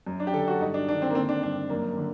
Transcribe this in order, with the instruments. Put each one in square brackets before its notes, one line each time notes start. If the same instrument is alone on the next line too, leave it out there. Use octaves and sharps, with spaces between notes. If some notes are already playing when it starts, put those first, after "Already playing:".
[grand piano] F#2
D4
G4
D3 A4
F#4
G2 D#4
D4
D#3 D4
C4
A#3
D3 C4
D4
G2 D4
F#2 A#3
D3